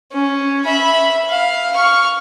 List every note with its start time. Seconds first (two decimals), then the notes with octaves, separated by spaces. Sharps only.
0.12 C#4
0.65 E5 B5
1.30 F5
1.74 C#6 F6